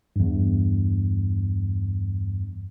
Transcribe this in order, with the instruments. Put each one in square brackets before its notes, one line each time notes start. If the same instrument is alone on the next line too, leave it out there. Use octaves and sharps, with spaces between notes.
[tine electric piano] E2 G2